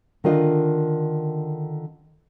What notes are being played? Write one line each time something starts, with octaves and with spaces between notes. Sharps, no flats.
D3 D#3 D4 F4 D#5